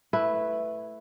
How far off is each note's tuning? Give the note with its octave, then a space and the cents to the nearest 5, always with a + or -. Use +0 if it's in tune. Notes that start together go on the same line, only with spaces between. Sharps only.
A3 +0 E4 +0 B4 +0